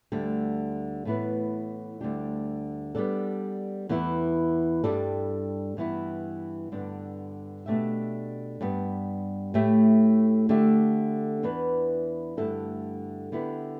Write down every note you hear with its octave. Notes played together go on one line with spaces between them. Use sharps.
D2 D3 G3
A2 E3 B3 E4 B4
D2 D3 G3 D4 G4
G3 B3 D4 A4
E2 E3 B3 E4
G2 G3 D4 A4
G2 E3 B3 E4
G2 D3 B3 D4
B2 A3 D4 G4 E5
G2 G3 B3
A2 A3 G4 E5
D3 A3 G4 E5
E2 E3 B3 D4 B4
G2 D3 A3 E4 A4
D3 B3 E4 G4